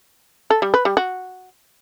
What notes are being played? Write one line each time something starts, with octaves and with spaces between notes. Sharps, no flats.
A4
G3
B4
G3
F#4